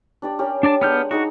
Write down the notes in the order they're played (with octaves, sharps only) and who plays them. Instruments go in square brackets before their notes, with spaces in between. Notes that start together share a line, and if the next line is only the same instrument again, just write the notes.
[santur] D4 G4 D5
C#4 G4 A#4
[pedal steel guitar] D4 D5 A5
[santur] G#3 D4 F#5 [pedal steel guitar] B3 F6 G6
[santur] D#4 G#4 A#5 [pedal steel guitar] F#4